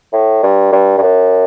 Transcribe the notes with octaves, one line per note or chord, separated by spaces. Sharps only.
A2
G2
G2
G2
F#2